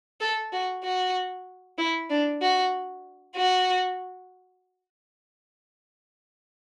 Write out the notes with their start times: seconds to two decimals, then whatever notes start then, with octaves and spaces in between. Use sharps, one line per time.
0.20 A4
0.53 F#4
0.83 F#4
1.78 E4
2.10 D4
2.42 F#4
3.36 F#4